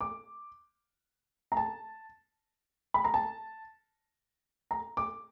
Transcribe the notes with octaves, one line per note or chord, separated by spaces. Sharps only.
D6
A#5
A5
B5
A#5
A5
A#5
D6